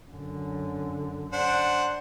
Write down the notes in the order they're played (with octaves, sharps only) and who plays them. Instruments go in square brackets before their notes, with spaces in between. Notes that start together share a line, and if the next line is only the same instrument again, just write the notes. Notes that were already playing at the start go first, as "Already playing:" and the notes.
[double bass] F#2 D3
[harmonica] D4 C5 F#5